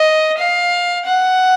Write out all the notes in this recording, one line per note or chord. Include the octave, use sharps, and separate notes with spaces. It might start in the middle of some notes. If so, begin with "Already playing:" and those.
Already playing: D#5
F5
F#5